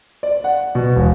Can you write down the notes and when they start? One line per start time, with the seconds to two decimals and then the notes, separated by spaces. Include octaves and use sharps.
0.23 D5
0.44 F#5
0.75 B2
0.96 E1